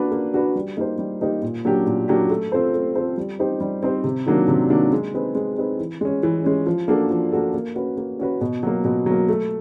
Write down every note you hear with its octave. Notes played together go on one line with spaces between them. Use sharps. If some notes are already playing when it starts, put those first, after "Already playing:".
Already playing: A#3 D4 F#4 B4
A#3
D4 F#4 B4
G3
A#3 D#4 G4 C5
G3
A#3 D#4 G4 C5
A#2
F#3 A#3 D4 G4
A#2
F#3 A#3 D4 G4
A3
C4 F4 A4 C5
A3
C4 F4 A4 C5
G3
C4 D#4 G4 C5
G3
C4 D#4 G4 C5
C3
D#3 F#3 A#3 D4
C3
D#3 F#3 A#3 D4
G#3
C4 D#4 G#4 B4
G#3
C4 D#4 G#4 B4
E3
G#3 C#4
E3
G#3 C#4
F3
A#3 D4 F#4 A4
F3
A#3 D4 F#4 A4
A#3
C#4 F#4 B4
A#3
C#4 F#4 B4
B2
F#3 A#3
B2
F#3 A#3
A3